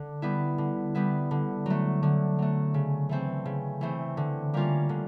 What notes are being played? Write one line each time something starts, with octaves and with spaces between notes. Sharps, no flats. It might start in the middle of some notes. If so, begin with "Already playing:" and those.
Already playing: D3
G3 B3 E4
D3
G3 B3 E4
D3
F#3 A3
D3
F#3 A3
C#3
E3 A3 C4
C#3
E3 A3 C4
D3
G3 A#3 C#4 F4
D3